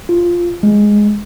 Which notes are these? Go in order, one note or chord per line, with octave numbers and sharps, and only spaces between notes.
F4
G#3